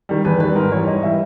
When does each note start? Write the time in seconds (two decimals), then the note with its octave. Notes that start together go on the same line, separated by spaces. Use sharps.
0.09 D#3 G3
0.25 E2 B4
0.40 D#3 G3 B4
0.56 G#2 A#4
0.72 E3 G3 C#5
0.87 G#2 D#5
1.02 E3 G3 E5